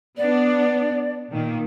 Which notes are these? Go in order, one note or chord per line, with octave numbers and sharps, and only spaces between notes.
B3 D4 D5
A#2 D#3 A#3